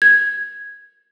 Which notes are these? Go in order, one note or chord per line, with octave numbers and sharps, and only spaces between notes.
G#6